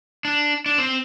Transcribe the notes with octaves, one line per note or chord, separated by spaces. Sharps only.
D4
D4
C4